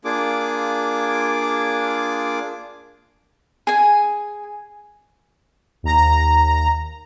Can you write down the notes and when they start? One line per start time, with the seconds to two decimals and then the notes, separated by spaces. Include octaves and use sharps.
0.05 A#3 D4 F4 G#4 D6
3.67 G#4 G#5
5.83 D#2 A#5